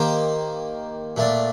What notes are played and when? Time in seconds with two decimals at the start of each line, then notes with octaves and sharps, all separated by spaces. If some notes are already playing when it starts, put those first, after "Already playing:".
Already playing: D#3 A#3 D#4 G4 C5
1.16 A#2 A3 D4